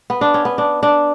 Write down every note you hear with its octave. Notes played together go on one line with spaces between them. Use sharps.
B3
D4
C#4
B3
D4
D4